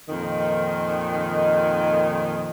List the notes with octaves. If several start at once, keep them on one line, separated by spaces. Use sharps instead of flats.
F2 A#2 D#3